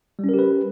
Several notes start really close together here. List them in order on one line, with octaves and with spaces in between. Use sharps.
G3 C#4 A#4 G4 B4